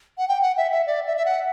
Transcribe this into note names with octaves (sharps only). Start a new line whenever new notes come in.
F#5
G5
F#5
E5
E5
D5
E5
E5
F#5